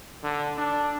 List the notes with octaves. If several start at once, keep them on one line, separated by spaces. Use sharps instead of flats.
D3
D4